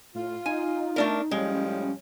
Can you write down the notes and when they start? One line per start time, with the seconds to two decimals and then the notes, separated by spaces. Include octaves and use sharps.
0.15 A2 F4
0.46 D#4 G#5
0.96 A3 D4 A#4
1.31 A2 F3 G3 G#3 C#4